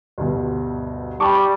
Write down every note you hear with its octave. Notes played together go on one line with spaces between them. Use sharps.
D2 G2 B2
G3 A5 C#6 D6